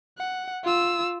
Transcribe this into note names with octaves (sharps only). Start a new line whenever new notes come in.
F#5
F4 E6